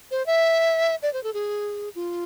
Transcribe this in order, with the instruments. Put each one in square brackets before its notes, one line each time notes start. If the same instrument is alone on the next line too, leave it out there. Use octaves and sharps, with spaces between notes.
[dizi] C5
E5
D5
C5
A4
G#4
F4